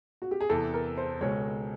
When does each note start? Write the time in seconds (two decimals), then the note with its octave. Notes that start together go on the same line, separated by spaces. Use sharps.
0.22 F#4
0.31 G4
0.41 G#4
0.49 E2 C3 E3 A4
0.74 A#4
0.98 C5
1.21 C#2 B2 G#3 C#5